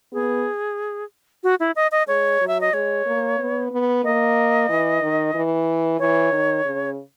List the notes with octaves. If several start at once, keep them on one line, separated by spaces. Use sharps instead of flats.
B3 G#4
F#4
E4
D#5
D#5
G#3 C#5
F#3
E5
D#5
G#3 C#5
A#3
B3
B3
A#3 D#5
E3
D#3
E3
E3 C#5
D#3
C#3